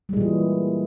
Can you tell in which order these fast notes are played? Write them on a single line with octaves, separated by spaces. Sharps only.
G3 G#3 A#2 E3